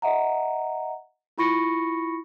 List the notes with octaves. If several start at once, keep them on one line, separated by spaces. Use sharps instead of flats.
D#5 E5 F#5 A#5
E4 F4 B5 C#6 A#6 C#7